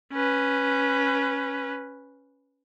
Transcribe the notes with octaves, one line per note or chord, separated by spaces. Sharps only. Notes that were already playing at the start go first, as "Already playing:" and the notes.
C#4 B4